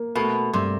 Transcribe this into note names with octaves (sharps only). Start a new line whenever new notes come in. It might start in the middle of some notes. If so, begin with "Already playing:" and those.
Already playing: A#3
B2 A3
G2 C3